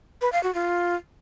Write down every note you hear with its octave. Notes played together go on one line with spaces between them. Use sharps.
B4
F5
F#4
F4